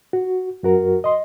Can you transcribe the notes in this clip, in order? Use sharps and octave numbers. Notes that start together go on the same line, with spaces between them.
F#4
F#2 F#4 A#4
D#5 C6